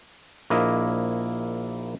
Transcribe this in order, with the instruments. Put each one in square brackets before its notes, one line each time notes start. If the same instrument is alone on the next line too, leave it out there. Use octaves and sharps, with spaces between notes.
[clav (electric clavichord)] A#1 A#3 E4 D#5